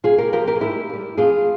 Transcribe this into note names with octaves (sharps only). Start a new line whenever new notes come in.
C3 F4 G#4
G4 A#4
F3 A#3 G4 A#4
G4 A#4
G#4
G#2 E4 G4
A#3
G3
F2 F4 G#4